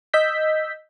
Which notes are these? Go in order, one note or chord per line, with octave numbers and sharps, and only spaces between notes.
D#5 E6 G6 B6